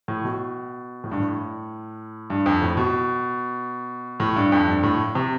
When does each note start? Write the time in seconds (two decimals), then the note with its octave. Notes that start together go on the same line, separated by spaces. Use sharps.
0.08 A2
0.24 B2
1.04 A2
1.12 G2
1.20 A2
2.30 G2
2.46 F2
2.62 A2
2.77 B2
4.20 A2
4.36 G2
4.52 F2
4.68 G2
4.83 A2
5.15 C3